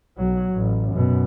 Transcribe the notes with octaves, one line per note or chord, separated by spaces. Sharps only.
B1 F#3
A1
F#2 B2